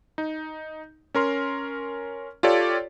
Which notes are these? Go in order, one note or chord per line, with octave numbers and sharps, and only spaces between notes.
D#4
C#4 A#4 C6
F4 G4 A4 C#5 D5